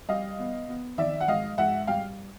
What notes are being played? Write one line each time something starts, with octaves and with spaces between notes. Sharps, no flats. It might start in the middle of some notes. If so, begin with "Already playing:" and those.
G3 D#5 F5
B3
B3
D#3 D5 E5
F#5
G#2 D#5 F5
G#2 E5 F#5
G3 F5 G5